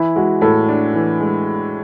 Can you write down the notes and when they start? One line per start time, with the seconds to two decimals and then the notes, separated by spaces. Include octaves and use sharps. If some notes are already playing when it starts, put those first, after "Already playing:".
Already playing: E3 E4
0.16 G#3 F#4
0.41 A2 A4
0.68 D4
0.94 E3
1.20 G#3